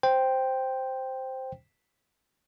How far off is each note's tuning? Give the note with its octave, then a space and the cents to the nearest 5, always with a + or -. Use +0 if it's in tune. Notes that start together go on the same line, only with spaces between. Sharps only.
C5 +0 G5 +0